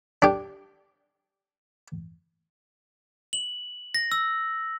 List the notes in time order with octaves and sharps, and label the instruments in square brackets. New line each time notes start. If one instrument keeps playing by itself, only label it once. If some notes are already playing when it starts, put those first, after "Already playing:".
[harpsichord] D4 G4
[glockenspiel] F#7
A#6
E6